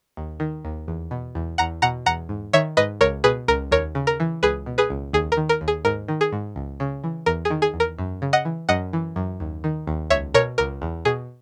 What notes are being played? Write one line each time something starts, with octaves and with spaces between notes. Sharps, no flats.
D#2
D#3
D#2
E2
B2
E2
E2 F#5 A#5
B2 F#5 A#5
E2 F#5 A#5
G#2
D#3 C#5 E5
G#2 B4 D#5
C#2 A#4 C#5
B2 G#4 B4
C#2 A#4
D#2 A#4 C#5
C#3
A#4
E3
C#2 G#4 B4
B2
G#4 B4
C#2
D#2 G#4
A#4
D#3
A#4
D#2
G#4
G#2 A#4
D#3
G#4
G#2
C#2
C#3
E3
E2 A#4
G#4
D#3
G#4
E2
A#4
F#2
C#3
D#5 F#5
E3
F#2 D#5 F#5
E3
F#2
D#2
D#3
D#2
C#2 C#5 E5
B2 A#4 C#5
C#2 A#4
E2
B2 G#4